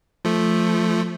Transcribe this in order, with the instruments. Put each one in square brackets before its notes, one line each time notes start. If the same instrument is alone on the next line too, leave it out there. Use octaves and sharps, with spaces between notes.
[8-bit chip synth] F3 A3